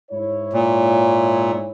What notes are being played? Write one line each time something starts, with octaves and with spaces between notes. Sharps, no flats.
G#2 E4 C#5
A#2